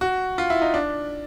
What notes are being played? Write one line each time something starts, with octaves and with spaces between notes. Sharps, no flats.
F#4
F4
E4
D#4
D4